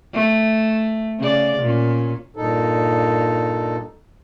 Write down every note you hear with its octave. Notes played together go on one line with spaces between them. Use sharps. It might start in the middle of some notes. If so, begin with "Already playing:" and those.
A3
C#3 D5
A#2 C#4
G2 A#2 D#4 A4